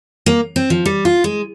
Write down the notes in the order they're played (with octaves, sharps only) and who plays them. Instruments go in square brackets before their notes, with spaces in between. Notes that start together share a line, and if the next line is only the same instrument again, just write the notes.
[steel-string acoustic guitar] A#3
C4
F3
G3
F4
G#3